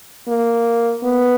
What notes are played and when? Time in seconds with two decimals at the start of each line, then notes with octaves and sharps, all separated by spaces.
0.28 A#3
1.03 B3